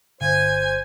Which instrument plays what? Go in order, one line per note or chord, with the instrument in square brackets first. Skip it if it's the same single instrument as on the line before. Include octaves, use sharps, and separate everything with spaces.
[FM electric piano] G1 [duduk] C5 [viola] G#5